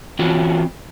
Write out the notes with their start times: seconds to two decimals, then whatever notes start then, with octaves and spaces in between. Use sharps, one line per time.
0.19 E3 C4 C#4 F4 F#4